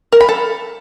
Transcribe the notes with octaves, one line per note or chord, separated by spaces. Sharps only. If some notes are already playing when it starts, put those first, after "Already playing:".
A#4
B5
A4